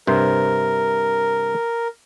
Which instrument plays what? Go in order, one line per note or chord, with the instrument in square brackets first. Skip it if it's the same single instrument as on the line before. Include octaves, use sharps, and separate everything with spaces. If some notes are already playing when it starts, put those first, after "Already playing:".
[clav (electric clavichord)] G2 C3 C5 [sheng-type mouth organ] A#4